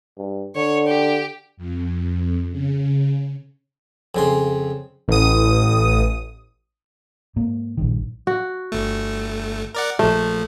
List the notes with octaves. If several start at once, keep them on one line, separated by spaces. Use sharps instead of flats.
G2
D3 C#5
G4
F2
C#3
F2 C#3 C6
A1 D#6
G#2 A#3
A#1 G2 D#3
F#4
G1 A3
A#4 D5 F#5
A#1 F3 A3